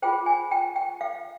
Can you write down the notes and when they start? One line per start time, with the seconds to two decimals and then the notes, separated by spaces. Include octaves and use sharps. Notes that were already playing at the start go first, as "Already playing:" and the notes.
0.02 F4 G#4 C5 G5
0.26 G#5
0.51 G5
0.76 G5
1.01 F5